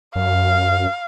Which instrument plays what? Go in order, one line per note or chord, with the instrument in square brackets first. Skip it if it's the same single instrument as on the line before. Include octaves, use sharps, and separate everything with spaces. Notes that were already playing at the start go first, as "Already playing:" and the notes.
[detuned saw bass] F#2 [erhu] F5